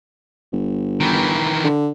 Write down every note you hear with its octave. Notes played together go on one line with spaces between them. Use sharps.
G1
D#3 E3
D3